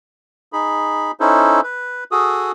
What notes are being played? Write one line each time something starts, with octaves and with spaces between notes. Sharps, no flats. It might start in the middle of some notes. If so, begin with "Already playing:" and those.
D#4 G#4 B5
C#4 D#4 E4 A4 C5
B4
F#4 G#4 A4 D#6